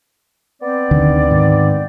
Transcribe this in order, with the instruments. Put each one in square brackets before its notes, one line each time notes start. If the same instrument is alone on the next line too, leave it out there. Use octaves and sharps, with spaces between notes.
[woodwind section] B3 C4 D5
[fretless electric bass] D2 D3 D#3
G#2 D#3